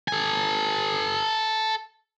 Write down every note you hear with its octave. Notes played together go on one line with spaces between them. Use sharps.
A4 G#5